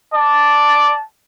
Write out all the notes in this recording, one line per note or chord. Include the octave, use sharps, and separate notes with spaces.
D5 A5